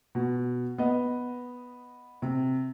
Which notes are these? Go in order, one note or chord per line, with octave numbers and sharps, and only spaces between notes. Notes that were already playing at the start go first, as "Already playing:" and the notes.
B2
B3 D#5
C3